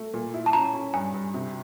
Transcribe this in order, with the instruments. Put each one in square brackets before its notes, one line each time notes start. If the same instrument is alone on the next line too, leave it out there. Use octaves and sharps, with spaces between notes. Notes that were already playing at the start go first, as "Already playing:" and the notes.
Already playing: [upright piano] A3
A#2
E4
[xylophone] A5
[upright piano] C#4 [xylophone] A#5
[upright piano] C#4
[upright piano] G2 [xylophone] G#5
[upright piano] G2
C3